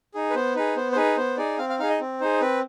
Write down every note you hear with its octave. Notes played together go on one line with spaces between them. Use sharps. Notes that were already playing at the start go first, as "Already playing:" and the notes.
D#4 G#4
B4
B3 C5
D#4 G#4 B4
B3 C5
C5
D#4 G#4 B4
B3 C5
D#4 G#4 D5
C4 F5
F5
D#4 G#4 F5
D#5
C4
D#4 G#4 C5
C4 B4